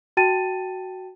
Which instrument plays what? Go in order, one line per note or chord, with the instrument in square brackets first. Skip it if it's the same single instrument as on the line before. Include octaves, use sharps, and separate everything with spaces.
[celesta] F#4 G5 A5 A6 D#7